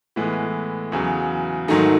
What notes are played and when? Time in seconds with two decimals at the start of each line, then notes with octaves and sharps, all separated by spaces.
0.16 A2 E3 G#3 B3
0.92 E2 C#3 F#3
1.68 G#2 D#3 F#3 A3 D#4